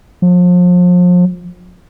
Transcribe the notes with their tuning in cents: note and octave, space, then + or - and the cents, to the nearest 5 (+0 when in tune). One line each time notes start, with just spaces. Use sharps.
F3 +35